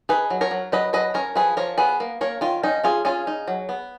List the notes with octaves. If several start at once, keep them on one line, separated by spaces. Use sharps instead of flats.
D#4 G#4 B4
F#3
A#4 C#5
F#3
F#3 B4 D#5
F#3 B4 D#5
C#4 A#4 C#5
F3 G#4 B4
F3 A#4 C#5
B3 G#4 B4
A#3
A#3 A#4 C#5
D#3 F4
C#4 D#4
C#4 F4 G#4
C#4 F4 G#4
D#4
F#3
B3